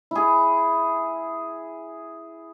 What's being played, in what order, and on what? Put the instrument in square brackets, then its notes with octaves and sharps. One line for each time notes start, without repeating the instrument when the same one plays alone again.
[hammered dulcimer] E4 G#4